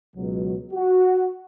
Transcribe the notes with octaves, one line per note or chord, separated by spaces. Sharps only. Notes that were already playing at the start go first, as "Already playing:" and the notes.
C#2 B2 F#3
F#4